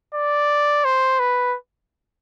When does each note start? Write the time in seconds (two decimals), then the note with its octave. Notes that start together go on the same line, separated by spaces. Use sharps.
0.15 D5
0.85 C5
1.20 B4